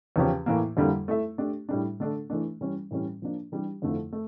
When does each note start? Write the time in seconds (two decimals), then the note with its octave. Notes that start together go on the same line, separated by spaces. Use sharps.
0.16 E2 C#3 F3 C#4 G4
0.46 A2 E3 A#3
0.77 F2 D3 G3 A#3 E4
1.08 A3 E4 A4 E5
1.38 A3 D4 G4
1.69 A2 G3 D4
2.00 D3 A3 D4 A4
2.30 E3 A3 D4
2.61 E3 G3 C#4
2.91 A2 E3 G3 C#4
3.22 F3 A#3 D4
3.52 E3 G3 D4 G4
3.82 F2 D3 F3 A3 E4
4.12 A3